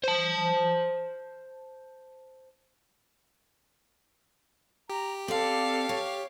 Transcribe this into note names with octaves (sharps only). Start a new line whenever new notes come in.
C5 A5
G4 A#5
C4 A4 D5 F5
C#5